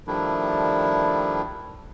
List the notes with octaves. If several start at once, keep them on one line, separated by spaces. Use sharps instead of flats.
D#3 F3 G3 A3 D4 E4